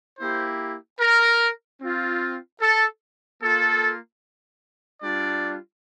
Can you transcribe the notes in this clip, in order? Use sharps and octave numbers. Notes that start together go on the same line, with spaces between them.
A#3 E4 G4 C5
A#4
C4 F4
A4
A#3 F4 A4
G3 D4 F4 D5